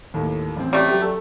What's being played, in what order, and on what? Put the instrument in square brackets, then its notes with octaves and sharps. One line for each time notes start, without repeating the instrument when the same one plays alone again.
[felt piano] D#2 A2
A1 C4
[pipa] G3 A3
[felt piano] F#3 G4
A4